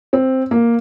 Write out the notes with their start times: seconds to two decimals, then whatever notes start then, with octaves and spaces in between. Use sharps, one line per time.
0.13 C4
0.51 A#3